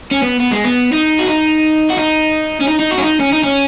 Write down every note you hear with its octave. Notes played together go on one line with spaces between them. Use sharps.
C#4
B3
B3
G#3
B3
D#4
F#4
D#4
F#4
D#4
C#4
D#4
D#4
F#4
C#4
D#4
C#4
D#4
C#4